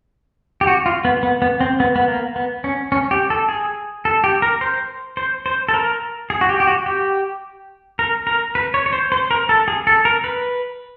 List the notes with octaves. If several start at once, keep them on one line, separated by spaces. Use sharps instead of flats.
G4
F#4
F4
B3
B3
B3
C4
B3
B3
A#3
B3
C#4
C#4
G4
A4
G#4
A4
G4
A#4
C5
C5
C5
A4
A#4
G#4
F#4
G4
G4
F#4
G4
A#4
A#4
B4
C#5
C#5
C5
C5
A#4
A4
G#4
A4
A#4
B4